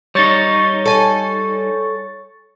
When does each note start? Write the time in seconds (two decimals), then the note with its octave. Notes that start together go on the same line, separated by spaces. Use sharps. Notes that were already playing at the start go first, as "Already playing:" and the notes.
0.15 G3 D#4 C#5 C#6 A6
0.85 A4 G#5